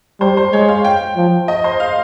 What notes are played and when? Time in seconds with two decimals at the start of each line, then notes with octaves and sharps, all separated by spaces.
0.20 G3 C5
0.37 C5
0.52 G#3 C#5
0.68 F5
0.85 G5
1.16 F3
1.48 D#5
1.64 C5
1.80 F5